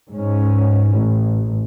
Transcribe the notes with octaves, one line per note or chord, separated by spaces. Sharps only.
G#2 C#4
A1